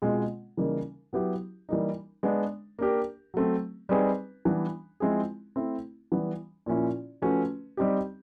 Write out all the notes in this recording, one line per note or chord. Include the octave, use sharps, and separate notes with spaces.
B2 G#3 C4 F4 G#4
C#3 E3 G3 A#3 D#4
F#3 B3 E4 G4
E3 G3 A#3 D#4
G#3 B3 D4
A#3 D4 G4 A#4
F#3 A3 C4
G3 C4 D#4 G#4 B4
E3 G3 B3 D4
F3 G#3 C4 E4 G#4
A3 C4 E4
E3 G3 B3
A#2 F3 A#3 C#4 E4
F3 A3 C#4 F#4 B4
G3 C4 D#4 G4